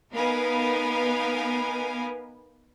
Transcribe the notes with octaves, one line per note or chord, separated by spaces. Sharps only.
B3 D#4 A#4 B4 F5 G#5